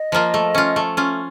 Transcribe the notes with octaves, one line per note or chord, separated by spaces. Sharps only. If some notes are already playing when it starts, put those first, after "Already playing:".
Already playing: D#5
F3 A#3 F4
A3
C#4 F4
A3
C#4 F4